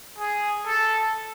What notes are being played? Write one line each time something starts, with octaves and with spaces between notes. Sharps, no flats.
G#4
A4